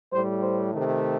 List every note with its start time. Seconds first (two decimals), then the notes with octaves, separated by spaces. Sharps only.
0.12 A2 G3 C5
0.42 C5
0.71 C3 D#3 A3